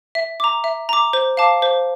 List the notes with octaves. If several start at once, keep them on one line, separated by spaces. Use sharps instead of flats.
E5
A#5 D6
E5
A#5 D6
C5
F5 A5 D6
C5